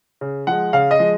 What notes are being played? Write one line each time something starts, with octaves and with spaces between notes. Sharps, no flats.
C#3
F3 G#3 F#5
C#3 F5
D#5
F3 G#3